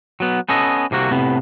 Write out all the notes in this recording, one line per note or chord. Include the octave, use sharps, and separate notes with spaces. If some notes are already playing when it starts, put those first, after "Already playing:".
F#3 B3
B3 C#4 A4 D#5
C2 C3 A#3 F#4
A2 C3 B3